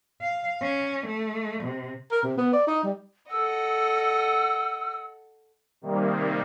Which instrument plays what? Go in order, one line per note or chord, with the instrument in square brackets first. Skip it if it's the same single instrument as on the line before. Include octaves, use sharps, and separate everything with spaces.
[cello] F5
C#4
A3
C3
[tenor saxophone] A#4
C3
B3
D5
D#4
G3
[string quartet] A4 D#5 F#5 [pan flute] E6
[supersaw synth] C3 D#3 G3 A#3